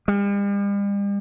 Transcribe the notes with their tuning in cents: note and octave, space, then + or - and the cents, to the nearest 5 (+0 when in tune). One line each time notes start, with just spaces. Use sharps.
G3 +45